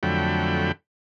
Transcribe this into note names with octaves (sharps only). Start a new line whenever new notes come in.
F2 D3 F#3 A3 G5 B5